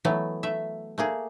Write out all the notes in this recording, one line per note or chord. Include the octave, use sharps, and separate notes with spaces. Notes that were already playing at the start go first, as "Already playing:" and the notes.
E3 F#3 A3 B3
A3 E5
A3 A#3 G#4